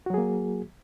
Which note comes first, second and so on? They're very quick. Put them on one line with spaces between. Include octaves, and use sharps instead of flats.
F#4 F#3 G#4 A#3